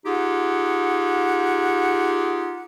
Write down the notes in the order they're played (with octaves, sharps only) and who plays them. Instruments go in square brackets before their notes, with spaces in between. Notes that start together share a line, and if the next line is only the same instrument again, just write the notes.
[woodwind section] D#4 F4 G4 G#4 F#5